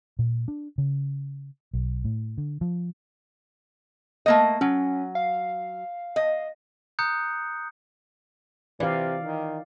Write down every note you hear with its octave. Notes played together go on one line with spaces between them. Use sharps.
A#2
D4
C#3
B1
A2
D3
F3
A3 A#3 D#5
F#3 C#4
F5
D#5
A#5 D#6 F#6 G6 C#7
C3 E3 D5 F5
D#3